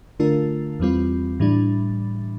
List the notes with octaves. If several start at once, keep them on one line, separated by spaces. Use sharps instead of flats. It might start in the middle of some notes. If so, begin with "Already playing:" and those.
D3 A3 D4 F4 A#4
E2 E3 G3 C4 F4
A2 E3 G3 D4